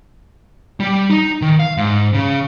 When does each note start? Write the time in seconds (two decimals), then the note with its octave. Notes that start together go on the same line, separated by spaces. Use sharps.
0.80 G3
1.11 D#4
1.42 D#3
1.60 F5
1.77 G#2
2.13 C#3